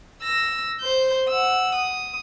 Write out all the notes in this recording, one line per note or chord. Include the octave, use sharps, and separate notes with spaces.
E6 A#6
C5 G6
F#5 E6
D#6